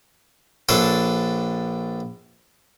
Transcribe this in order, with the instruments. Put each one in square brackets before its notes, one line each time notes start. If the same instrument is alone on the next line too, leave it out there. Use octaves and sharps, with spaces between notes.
[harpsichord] A#1 D4 A4 B4 C#5 C6